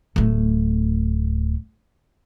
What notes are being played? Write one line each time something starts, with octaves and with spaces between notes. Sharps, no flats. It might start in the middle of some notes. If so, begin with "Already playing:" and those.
D1 A3